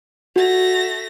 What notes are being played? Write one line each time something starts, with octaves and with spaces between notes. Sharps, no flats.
A3 F#4 A#6